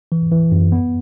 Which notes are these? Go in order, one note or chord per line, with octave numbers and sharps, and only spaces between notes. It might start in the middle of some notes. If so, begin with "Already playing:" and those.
E3
E3
F#2
B3